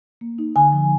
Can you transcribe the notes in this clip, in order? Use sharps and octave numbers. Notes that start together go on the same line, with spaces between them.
A#3
D#4
D3 G#5
F3